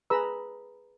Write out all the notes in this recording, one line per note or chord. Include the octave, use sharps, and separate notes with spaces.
G#4 B4 A#5 B5 E6